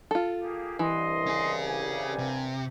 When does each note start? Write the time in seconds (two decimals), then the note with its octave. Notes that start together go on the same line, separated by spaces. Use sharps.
0.11 F4 A4
0.41 A#3 G4 G#4
0.79 C2 G2 E3 D#5 C6
1.27 C#4 G#4
1.63 G3 G4 G#5
2.19 C3